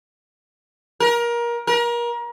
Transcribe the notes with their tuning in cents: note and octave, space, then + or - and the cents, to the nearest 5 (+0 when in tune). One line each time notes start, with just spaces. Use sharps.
A#4 +25
A#4 +30